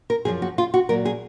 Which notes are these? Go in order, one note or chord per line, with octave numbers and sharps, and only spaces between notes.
A#4
F#2 F3 G#4
F#4
F4
F#4
A#2 F#3 A#4
G#4